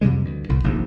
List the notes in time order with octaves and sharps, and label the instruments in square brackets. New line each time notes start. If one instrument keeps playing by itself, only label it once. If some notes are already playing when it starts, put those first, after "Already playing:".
[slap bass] F2 C3 G3 G#3
D2 G2
C2 A2
F1 A#1 D#2 G#2